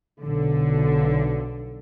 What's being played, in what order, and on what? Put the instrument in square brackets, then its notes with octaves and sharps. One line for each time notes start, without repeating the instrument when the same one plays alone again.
[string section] B1 D3